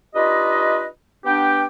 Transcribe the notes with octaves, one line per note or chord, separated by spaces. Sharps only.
D4 D#4 F4 G4 B4 D#5
B3 D4 G4 G5